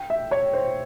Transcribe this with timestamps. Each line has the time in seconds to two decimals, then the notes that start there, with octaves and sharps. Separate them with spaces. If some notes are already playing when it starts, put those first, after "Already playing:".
Already playing: G5
0.10 E5
0.31 C#5
0.53 C5